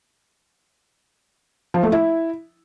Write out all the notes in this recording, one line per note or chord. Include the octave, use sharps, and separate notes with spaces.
F3
A3
E4